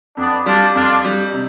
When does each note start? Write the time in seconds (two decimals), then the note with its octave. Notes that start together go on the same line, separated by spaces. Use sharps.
0.17 F2 B3 D4
0.46 G3 D4 F4
0.75 F2 D4 F4
1.05 G3
1.33 C3